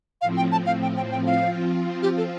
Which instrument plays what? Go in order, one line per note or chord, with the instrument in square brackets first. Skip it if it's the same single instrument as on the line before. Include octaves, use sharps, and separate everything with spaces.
[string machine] A2 F3 C4 [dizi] F5
[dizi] G5
A5
F5
G5
G5
G5
F5
[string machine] F3 C4 F4
[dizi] G4
A4